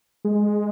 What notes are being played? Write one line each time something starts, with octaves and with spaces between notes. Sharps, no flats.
G#3